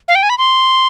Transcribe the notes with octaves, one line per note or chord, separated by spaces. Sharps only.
F5
G5
G#5
B5
C6